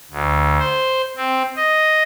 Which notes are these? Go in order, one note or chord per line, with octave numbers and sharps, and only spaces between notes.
D2
C5
C4
D#5